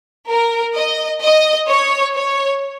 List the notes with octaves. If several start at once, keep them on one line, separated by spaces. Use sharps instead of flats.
A#4
D#5
D#5
C#5
C#5